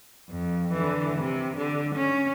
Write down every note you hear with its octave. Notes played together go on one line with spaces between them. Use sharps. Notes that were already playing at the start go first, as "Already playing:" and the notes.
F2
D3 E3
C3
D3
C#4